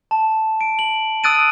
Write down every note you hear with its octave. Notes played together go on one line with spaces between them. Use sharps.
A5
D7
F#7
D#6 E6 F#6 A6 D7 D#7